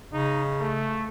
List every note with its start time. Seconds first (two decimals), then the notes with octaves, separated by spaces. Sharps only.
0.12 C#3 D#4
0.60 A3